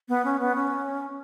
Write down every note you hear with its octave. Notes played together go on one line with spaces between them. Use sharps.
B3
C#4
B3
C#4